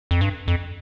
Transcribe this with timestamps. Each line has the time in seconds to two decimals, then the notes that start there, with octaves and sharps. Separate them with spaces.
0.11 F2
0.21 G2
0.48 F2